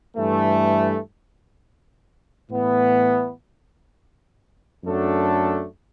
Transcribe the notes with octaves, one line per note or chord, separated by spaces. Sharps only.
G2 E3 A3
A2 E3 B3
F#2 F#3 A3 D4 A4